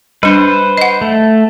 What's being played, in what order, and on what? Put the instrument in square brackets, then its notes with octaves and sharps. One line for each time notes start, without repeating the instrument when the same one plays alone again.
[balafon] G3 D4 [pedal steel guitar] B4 C5
[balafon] D#5 F#5
[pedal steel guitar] A3